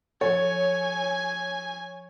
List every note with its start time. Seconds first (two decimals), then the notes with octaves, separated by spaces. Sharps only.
0.21 F3 A4 C#5 G#5